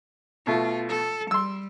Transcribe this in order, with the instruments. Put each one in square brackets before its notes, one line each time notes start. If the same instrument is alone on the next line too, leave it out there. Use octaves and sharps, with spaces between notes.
[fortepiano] B2 A3 [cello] F4
[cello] A4
[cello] G3 [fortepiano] C6 E6